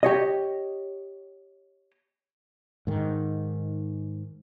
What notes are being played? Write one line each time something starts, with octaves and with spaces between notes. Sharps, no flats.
G4 C#5 D#5
G#2 D#3